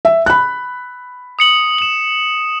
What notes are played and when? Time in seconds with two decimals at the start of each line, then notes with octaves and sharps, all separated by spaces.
0.05 E5
0.26 B5 F#6
1.39 D#6 C#7 F#7
1.78 E7 F#7